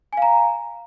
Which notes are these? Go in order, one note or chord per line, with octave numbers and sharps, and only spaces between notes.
F5 G#5 A#5